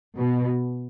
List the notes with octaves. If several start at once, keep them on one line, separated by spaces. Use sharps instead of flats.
B2